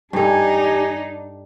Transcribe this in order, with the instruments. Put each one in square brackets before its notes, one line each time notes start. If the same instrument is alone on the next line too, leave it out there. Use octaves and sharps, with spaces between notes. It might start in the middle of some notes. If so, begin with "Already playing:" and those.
[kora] G2 A4 [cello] D4 D#4 [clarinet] G4 [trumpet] G#5